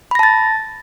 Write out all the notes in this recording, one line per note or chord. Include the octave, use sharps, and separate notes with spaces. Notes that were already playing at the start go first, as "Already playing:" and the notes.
A5 B5 A6 A#6